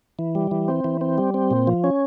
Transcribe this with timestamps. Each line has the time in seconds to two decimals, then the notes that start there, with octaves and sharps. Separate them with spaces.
0.19 E3
0.35 G3
0.51 E3
0.68 C4
0.84 E3
1.01 C4
1.18 G3
1.34 C4
1.51 A#2
1.67 F3
1.84 C#4